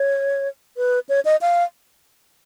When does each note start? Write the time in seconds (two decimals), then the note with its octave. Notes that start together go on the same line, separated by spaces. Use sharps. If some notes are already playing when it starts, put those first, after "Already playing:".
Already playing: C#5
0.77 B4
1.09 C#5
1.25 D#5
1.41 F5